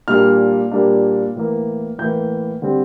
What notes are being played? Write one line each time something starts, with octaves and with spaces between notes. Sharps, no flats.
A#2 G3 A#3 D4 F6
A#2 G3 A#3 D4
A2 E3 A#3
A2 E3 A#3 G6
D3 G3 C4